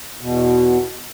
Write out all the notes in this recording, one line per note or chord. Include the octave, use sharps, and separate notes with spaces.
E2 B2